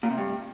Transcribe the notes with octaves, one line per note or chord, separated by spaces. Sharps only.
A#2
C3
G2